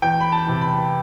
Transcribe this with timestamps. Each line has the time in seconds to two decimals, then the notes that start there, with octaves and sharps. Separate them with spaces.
0.02 E2 G5
0.21 B5
0.32 A5
0.46 C3 E3
0.61 B5